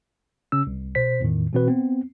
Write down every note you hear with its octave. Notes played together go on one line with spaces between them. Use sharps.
C#3 C#4 E6
C2
B2 C5 B6
E2 A2 D#3
B2 E3 C4 F#4 B4
B3 C4